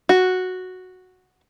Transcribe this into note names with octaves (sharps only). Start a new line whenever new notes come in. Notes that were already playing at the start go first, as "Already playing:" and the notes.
F#4